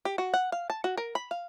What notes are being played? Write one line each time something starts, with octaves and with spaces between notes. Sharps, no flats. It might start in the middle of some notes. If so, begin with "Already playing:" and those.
G4
F#4
F#5
F5
A5
F#4
A#4
B5
F5